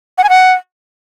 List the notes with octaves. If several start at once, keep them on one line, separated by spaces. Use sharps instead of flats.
F#5
G#5
F#5